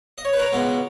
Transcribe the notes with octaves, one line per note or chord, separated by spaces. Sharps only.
D#5
C#5
B4
A#4 C#5
C#2 B2 G#3 B3